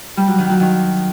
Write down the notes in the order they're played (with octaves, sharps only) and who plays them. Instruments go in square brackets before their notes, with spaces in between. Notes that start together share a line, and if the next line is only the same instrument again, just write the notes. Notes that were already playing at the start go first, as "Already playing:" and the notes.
[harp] G3
F#3
D#3
F#3
D#3